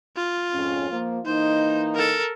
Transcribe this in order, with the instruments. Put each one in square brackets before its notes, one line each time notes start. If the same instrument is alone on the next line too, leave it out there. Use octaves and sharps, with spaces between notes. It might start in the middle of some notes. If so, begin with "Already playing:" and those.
[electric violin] F4
[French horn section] F2 G#2 C#4
F3 A#3
[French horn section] E3 A#3 D#4 [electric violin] C5
[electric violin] A4 A#4